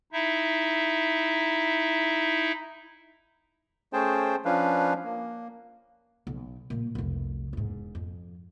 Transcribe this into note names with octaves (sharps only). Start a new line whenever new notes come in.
D#4 E4 E5
A3 C#4 G#4 C5 G5 A5
F3 C#4 D4 B4 F5
A#3
B1
A#2 G3
F1 C2
E1 G#2
F2